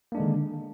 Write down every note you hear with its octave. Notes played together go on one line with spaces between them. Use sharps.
D3 D#3 G#3 A#3 D4